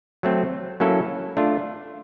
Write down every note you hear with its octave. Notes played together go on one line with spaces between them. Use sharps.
F#3 A3 C4
F#3 A#3 C#4 E4 A4
A3 D4 F4